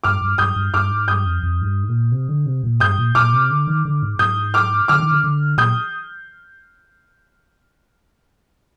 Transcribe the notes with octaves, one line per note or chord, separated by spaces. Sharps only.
G2 D6 F6
G2
G2 D#6 G6
G2
G2 D6 F6
G#2
G2 D#6 G6
F2
F2
G#2
G2
G#2
A#2
C3
D3
C3
A#2
G2 D#6 G6
A#2
A#2 D6 F6
C3
D3
D#3
D3
G#2
G#2 D#6 G6
D6 F6
D3 D6 F6
D#3
D3
D3
A#2 D#6 G6